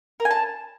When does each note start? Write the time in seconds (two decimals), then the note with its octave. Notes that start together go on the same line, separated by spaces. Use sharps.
0.20 A#4
0.25 G#5
0.31 A5